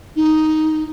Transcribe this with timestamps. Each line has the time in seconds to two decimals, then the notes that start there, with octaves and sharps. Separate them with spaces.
0.15 D#4